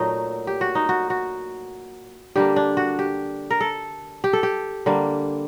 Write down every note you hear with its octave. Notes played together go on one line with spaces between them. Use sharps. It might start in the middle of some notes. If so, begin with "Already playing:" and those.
Already playing: A#2 F#3 A3 D#4
G4
F#4
D#4
F#4
F#4
D3 G3 A#3 G4
D4
F#4
G4
A#4
A4
G4
A4
G4
D3 G3 A#3